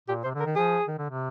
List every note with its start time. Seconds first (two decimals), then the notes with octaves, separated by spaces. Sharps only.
0.08 A#2 G4
0.24 C3 C5
0.35 D3
0.40 A#4
0.46 D#3
0.56 F3 G#4
0.88 D#3
0.98 D3
1.09 C3